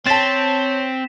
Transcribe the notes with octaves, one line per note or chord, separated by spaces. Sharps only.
C4 C#5 A5 A6 B6 E7